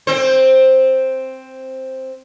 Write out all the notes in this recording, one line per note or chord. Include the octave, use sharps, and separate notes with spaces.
C4 C5